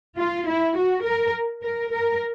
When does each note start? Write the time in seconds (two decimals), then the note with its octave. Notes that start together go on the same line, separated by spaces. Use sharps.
0.18 F4
0.48 E4
0.76 F#4
1.04 A#4
1.63 A#4
1.92 A#4